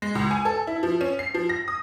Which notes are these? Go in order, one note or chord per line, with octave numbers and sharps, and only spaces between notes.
G#3
C#2
G#5
A4
E4
F3
C#4
C7
F3
A#6
D#6